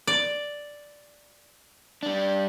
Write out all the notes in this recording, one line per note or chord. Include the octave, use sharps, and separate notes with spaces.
D5
G3 D4